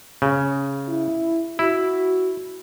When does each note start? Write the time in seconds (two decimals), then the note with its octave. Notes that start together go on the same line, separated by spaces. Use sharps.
0.22 C#3
0.88 E4
1.59 E4 F#4